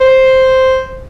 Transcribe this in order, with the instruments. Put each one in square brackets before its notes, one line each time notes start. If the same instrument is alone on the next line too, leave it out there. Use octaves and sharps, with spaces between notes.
[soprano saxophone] C5